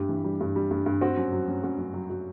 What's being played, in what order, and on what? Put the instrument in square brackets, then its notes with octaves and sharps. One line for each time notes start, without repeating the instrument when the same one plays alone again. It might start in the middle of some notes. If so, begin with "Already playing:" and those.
Already playing: [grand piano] G2 G3 G4
E3
G3
G2
G3
G2
G2
C4 F#4
F#2
F#3
F#2
F#2 F#4
F#2
F#3
F#3